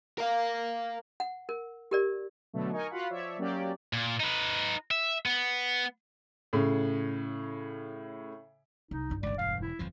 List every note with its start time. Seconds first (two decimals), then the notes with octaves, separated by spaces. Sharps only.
0.18 A#4 F5
1.20 F#5
1.49 A#4
1.91 G4 A#4 D5
2.53 B2 D3 F#3 A3
2.72 D#4 A#4 G#5 C#6
2.90 F4 F#4 F5 F#5 B5
3.10 F3 C#5 D5 E5
3.38 F#3 A#3 C#4 G4 D5
3.93 A#2
4.20 D#4 B4
4.91 E5
5.26 B3
6.53 A2 C#3
8.91 C2 D#4
9.10 G1 G2
9.23 G#1 C#2 D5
9.39 E1 F5
9.62 E4
9.79 G1 F2 F3